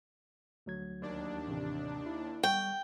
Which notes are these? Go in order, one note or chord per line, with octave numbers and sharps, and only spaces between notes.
D2 F#3 G#6
D#2 D4
A1 C3
E4
G3 G5 C#6